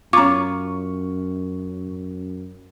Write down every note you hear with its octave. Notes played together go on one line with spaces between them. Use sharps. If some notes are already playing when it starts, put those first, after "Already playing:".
F#2 C#4 F4 A#5 C#6 D6